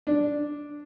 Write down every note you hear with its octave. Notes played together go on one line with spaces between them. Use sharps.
D4